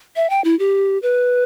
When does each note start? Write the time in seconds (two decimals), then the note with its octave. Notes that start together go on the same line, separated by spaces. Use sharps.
0.16 E5
0.30 G5
0.44 E4
0.59 G4
1.02 B4